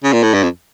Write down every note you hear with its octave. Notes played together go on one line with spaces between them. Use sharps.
C#3
A#2
A2
G2
F2